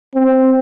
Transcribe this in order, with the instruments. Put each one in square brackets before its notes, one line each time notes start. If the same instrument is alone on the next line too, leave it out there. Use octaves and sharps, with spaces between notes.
[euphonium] C4